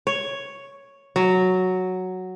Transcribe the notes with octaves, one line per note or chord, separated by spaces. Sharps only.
C#5
F#3